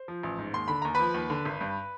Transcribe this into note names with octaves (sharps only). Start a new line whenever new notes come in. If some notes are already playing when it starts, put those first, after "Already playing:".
Already playing: C5
F3
A1
G#2
D#2 C6
D3 B5
D#2 A#5
F3 B4 B5
D#2
D3
G#1
G2